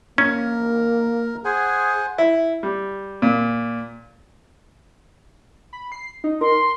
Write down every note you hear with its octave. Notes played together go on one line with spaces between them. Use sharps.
A#3 C#4 A#4
G#4 C5 F#5 G#5
E4
G3
A#2
B5
C7
D#4
A#4 C6